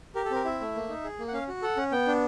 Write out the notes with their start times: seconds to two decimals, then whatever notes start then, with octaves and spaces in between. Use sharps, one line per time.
0.15 G4 A#4
0.25 A4
0.31 C4 A#4
0.45 E4 E5
0.60 A3
0.75 A#3
0.89 D#4
1.04 G#4
1.19 A#3
1.28 F#5
1.33 C#4 F5
1.48 F#4
1.62 A4 F#5
1.77 C#4
1.92 B3 G5
2.07 D4